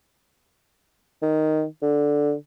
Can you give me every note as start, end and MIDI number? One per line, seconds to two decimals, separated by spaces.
1.22 1.64 51
1.82 2.33 50